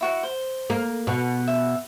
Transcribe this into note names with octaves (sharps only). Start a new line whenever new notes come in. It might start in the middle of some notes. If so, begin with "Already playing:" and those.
E4 F#4 F#5
C5
A#3
B2 C#6
E5